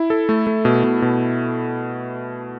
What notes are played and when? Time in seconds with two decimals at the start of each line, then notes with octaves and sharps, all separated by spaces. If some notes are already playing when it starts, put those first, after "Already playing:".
Already playing: E4
0.10 A4
0.29 A3
0.47 A3
0.65 B2
0.84 B2
1.02 B2